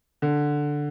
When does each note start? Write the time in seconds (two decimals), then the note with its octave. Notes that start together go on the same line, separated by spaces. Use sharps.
0.22 D3